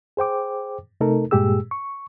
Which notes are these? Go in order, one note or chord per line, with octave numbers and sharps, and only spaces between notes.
G#4 C5 G5 D6
C3 A3 D#4 A4 A#4
G2 A#2 G#3 G4 G#4 E6
C#6